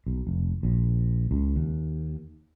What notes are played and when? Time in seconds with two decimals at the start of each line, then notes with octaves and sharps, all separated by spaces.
0.07 B1
0.27 F1
0.63 A#1
1.31 C#2
1.56 D#2